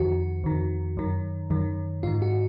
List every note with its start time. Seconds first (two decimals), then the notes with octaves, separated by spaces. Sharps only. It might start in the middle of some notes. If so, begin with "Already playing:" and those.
Already playing: F2 D#3 F#4
0.44 F2 D#3
0.97 F#2 D#3
1.50 F#2 D#3
2.03 G#2 D#3 F4
2.22 F#4